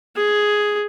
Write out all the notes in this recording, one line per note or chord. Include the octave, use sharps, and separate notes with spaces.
G#4